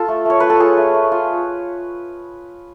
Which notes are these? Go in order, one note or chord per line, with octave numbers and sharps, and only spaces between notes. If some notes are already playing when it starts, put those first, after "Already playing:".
Already playing: F4 A4
A3
A3 C#5
A3 B4
A4
F4 G#4
A3
A3
F4